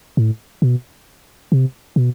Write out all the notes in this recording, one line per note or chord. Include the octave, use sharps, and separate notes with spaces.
A2
B2
C3
B2